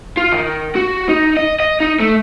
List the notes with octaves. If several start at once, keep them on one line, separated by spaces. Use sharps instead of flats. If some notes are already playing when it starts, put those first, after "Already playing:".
F4
D#3
F#4
D#4
D#5
D#5
D#4
A3